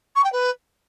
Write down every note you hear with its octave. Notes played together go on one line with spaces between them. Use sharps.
C#6
G5
B4